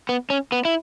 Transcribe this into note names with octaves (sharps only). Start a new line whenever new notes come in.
B3
C#4
B3
E4